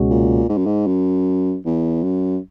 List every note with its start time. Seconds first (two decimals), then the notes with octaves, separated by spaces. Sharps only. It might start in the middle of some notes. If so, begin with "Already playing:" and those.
Already playing: C#2 B2 G#3 C#4 F#4
0.11 A#2
0.49 G#2
0.58 F#2
0.66 G#2
0.87 F#2
1.65 E2
2.03 F#2